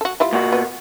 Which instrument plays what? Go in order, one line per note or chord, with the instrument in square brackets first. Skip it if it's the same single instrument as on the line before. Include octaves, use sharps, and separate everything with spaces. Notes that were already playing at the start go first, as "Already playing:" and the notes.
[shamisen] F#4 A4
G3 E4 F4
[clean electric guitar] A#2 F#4
[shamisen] B3